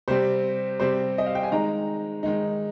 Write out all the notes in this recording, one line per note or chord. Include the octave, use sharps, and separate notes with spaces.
C3 G3 C4 C5
C3 G3 C4 C5
D#5
F5
G5
G#5
D#3 G#3 D#4 A#5
D#3 G#3 D#4